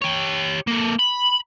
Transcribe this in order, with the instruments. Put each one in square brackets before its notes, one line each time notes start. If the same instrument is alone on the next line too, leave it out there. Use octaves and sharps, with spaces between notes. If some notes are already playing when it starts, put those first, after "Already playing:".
[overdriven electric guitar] G4 C#5
A#3 A4
B5